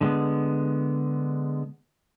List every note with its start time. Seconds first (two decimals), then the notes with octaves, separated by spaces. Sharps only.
0.01 D3 G#3 B3